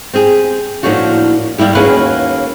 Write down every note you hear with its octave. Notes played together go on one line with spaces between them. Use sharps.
C4 G4 G#4
A2 F3 A#3 D4 D#4 F#4
G3 A#3 E4 G4
D#2 A#3 C#4 F#4 G#4 B4